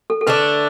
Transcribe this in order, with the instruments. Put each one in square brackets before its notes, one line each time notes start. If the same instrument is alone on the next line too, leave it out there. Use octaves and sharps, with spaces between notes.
[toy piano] A4
A4
[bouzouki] D3 A3 D4 [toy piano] B4